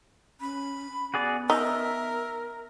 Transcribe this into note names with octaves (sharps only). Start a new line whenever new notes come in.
C#4 B5
B3 F#4 G#4 D5
D#4 A#4 E5